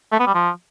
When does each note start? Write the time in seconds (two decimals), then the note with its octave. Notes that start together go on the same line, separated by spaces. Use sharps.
0.12 A3
0.19 B3
0.27 G3
0.34 F3